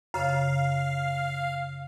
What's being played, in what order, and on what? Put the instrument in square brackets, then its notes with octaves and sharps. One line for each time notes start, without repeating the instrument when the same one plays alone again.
[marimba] F#2 C#3 [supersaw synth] F5